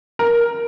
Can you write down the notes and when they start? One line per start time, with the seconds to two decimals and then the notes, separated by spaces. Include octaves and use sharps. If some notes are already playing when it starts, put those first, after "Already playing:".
0.19 A#4